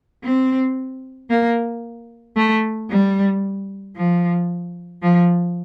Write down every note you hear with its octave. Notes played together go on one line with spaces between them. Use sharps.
C4
A#3
A3
G3
F3
F3